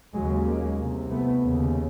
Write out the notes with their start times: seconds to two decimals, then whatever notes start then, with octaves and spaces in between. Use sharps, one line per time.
0.14 D#2 C#3 F#3 G#3
0.46 G#3 A#3
0.78 C2 C3
1.09 A3 B3
1.41 D#2 C#3